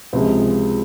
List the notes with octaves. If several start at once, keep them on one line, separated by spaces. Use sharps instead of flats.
C#2 C3 F3 G#3